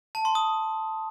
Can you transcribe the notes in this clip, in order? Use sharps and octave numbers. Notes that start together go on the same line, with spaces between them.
A5
C6
D#6